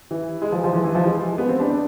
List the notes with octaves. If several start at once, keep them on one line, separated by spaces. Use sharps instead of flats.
E3
G#3
F3
F3
E3
E3
F3
G#3
B3
C4
D4
D4